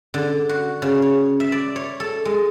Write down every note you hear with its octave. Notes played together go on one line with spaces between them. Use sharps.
D3
F#4
C#3
C#5
E5
D5
C#5
A4
G#3